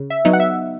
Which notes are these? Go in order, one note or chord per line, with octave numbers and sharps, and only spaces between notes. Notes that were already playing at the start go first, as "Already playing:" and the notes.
Already playing: C#3
E5
F#3 B3 D#4
F#5
E5